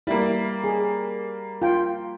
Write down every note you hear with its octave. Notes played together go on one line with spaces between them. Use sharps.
G3 A#3 E4
G#4
F4 G5